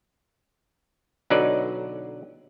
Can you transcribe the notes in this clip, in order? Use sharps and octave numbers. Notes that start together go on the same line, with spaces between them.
B1 D3 F#3 D#4 B4 D5